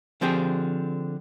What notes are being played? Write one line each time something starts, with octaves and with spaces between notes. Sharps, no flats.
D3 F3 C4 G4 G#4